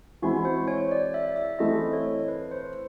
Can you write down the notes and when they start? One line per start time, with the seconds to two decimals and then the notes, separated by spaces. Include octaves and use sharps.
0.22 E3 G#3 C4 E4 F#4
0.45 C5
0.68 C#5
0.91 D5
1.14 E5
1.36 E5
1.59 E3 A3 C4 E4 D#5
1.93 C#5
2.28 B4
2.51 C5